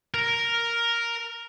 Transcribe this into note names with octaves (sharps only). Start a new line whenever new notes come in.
A#4